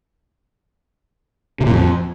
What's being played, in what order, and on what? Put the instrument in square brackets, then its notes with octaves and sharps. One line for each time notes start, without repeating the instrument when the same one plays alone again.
[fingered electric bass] C3
A#2
F2